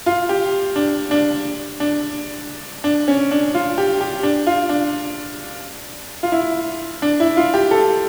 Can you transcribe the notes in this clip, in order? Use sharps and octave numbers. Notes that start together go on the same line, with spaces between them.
F4
G4
D4
D4
D4
D4
C#4
D4
F4
G4
G4
D4
F4
D4
F4
E4
D4
E4
F4
G4
A4